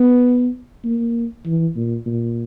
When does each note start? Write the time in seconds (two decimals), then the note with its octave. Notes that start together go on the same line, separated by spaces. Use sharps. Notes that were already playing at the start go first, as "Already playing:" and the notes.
Already playing: B3
0.85 A#3
1.46 E3
1.76 A#2
2.06 A#2